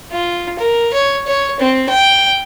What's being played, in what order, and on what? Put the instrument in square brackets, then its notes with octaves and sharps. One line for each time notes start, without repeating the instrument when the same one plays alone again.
[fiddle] F4
A#4
C#5
C#5
C4
G5